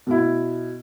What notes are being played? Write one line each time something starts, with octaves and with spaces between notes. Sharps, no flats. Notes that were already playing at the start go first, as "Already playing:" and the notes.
B2 E4